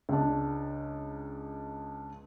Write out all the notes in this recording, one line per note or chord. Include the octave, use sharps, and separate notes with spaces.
C#2 D4